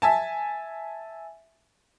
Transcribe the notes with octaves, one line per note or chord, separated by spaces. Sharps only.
E5 G#5 A5